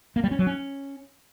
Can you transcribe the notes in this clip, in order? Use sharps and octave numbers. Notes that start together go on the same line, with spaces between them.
A#3
G3
C#4
F#3
C#4